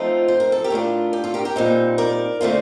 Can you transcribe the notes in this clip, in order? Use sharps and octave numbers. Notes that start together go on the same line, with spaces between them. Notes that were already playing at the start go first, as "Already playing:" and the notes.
Already playing: F3 A3 C4 D#4 F4 A4
C5
A#4
A4
G4 A#4
A2 A3 D4 F4
G4
F4 A4
G4 A#4
G4 A#4
A#2 G3 C4 D#4
A#4 D5
D3 A3 C4 F4